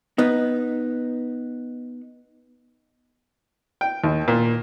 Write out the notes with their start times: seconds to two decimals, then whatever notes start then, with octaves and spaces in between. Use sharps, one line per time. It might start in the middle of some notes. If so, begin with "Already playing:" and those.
0.18 B3 D#4
3.81 G5
4.04 D#2
4.28 A#2